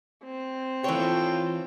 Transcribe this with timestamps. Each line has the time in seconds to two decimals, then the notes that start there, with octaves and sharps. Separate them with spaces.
0.24 C4
0.84 E3 F4 A4 C#5 G5